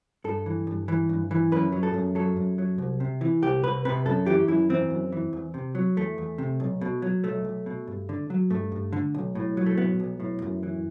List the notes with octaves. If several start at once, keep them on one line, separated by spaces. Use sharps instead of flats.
G2 A4
E3
G2
E3
G2
E3
F#2 B4
F#3
A4
F#2
F#3 A4
F#2
F#3
C2
C3
E3
C2 G4
C2 B4
C3 B4
F#2 A4
E3 G4
F#2 E4
E3 C4
F#2
E3
E2
C3
F#3
E2 A3
E2
C3
B1
B2
F#3
B1 A3
B1
B2
G2
D3
F#3
G2 A3
G2
D3
B1
A2
F#3
A3
B1 B3
B1
A2
F#2
E3